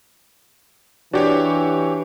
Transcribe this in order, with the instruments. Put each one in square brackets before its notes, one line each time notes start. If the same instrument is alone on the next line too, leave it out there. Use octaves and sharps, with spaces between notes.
[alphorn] E3 [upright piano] D4 [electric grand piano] F#4 G4 C#5